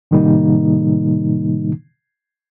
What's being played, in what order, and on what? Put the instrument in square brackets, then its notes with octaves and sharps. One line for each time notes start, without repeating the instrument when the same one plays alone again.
[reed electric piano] A2 C3 D#3 G3 A#3 D#4